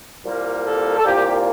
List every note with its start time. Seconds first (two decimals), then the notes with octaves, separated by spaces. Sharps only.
0.25 C2 A#2 G3 A#3
0.65 A4
0.97 A4
1.05 C2 A#2 G3 A#3 G4